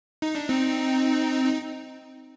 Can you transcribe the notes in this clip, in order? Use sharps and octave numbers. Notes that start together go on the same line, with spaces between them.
D#4
D4
C4 D#4
D#4